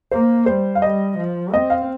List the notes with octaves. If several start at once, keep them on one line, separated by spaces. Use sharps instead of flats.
A#3 C5
G3 C5
F5
G3 D#5
F3
C4 D#5
F5